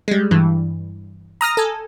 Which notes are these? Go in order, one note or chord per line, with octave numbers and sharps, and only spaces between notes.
G3 G#3
G2 E3
A#5 D#6 F6 A#6
A4 G#5